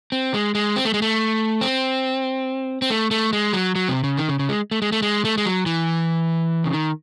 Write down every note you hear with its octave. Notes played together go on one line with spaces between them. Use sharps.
C4
G#3
G#3
C4
A3
G#3
A3
C4
C4
A3
A3
G#3
F#3
F#3
C3
C#3
D#3
C#3
C#3
G#3
A3
G#3
A3
G#3
A3
G#3
F#3
E3
C#3
D#3